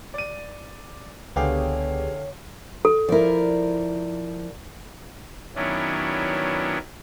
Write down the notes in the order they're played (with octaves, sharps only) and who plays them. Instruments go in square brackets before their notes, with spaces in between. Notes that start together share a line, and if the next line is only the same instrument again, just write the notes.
[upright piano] D5 D#7
[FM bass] C#2 [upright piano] D3 F5 G5 [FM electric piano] B3 G4 G#4 [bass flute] C#5
[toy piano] A4
[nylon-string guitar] F3 E4 [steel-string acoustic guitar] A#4 D5
[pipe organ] D#3 F#3 B3 C#4 D4 E4